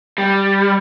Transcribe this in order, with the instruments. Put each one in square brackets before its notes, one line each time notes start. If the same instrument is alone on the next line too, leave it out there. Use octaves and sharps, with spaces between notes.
[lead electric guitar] G3